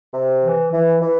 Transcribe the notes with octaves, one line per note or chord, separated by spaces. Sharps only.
C3
E3
E3
E3